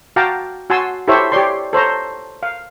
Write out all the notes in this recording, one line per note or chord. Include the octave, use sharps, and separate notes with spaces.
F#4 F5 G5 A5 A#5 D6
F#4 G#5 A5 C6 E6
E4 G4 A4 C5 C#5 E5
G4 C#5 D5 C6
A4 C5 C#5 A#5
F5